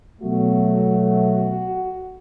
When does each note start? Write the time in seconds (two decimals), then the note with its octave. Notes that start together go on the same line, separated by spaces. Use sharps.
0.21 B2 F#3 A3 F#4